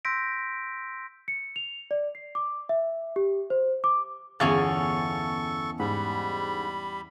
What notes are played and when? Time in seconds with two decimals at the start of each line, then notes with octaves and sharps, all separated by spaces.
0.05 C6 E6 G6 A#6 B6 D7
1.28 C#7
1.56 F7
1.91 D5
2.15 C7
2.35 D6
2.69 E5
3.16 G4
3.50 C5
3.84 D6
4.40 G1 E2 C#4 A4 F5 G#5 C#6 A6
5.80 G#2 G3 B5